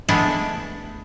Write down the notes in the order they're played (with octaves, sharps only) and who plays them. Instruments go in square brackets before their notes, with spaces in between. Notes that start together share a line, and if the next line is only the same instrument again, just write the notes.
[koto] G#3 A3 B3 D4 E4 E5